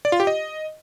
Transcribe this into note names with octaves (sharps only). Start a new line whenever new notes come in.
D5
F4
G4
D#5